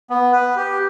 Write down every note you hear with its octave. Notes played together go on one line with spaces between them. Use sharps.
B3
B4
G4